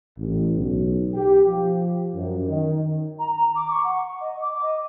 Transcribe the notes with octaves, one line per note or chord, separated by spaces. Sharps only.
A1
B1
G4
F3
F#2
D#3
A#5
A#5
D6
C#6
F#5
D#5
D6
D#5